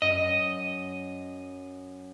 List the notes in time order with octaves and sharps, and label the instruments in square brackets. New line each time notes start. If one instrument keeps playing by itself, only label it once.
[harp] F#2 [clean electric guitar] D#5